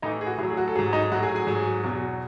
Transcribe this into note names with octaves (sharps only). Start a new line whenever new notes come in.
A2 E3 D#4 D#5
G#4
F#4
A2 F#3 G#4
G#4
F#4
A4
G#2 F#3 G#4
D#4 D#5
A2 F#3 F#4 F#5
G#4 G#5
G#4 G#5
G#2 F#3
E2 B2 F#3